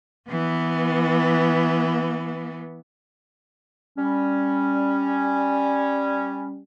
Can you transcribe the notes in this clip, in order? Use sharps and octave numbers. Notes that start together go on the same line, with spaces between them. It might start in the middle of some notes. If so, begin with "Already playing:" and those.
E3 B3
G3 C#4